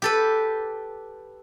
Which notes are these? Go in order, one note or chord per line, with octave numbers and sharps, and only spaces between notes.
G4 A4 B4